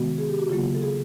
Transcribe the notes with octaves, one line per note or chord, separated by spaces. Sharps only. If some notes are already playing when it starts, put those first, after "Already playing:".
Already playing: C3 D#3 G#3 B3 F#4
G#4
G4
F#4
C#3 F#3 A#3 F4
A4
G#4